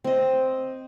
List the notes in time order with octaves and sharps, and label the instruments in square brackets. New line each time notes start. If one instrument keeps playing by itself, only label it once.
[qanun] C4 D#5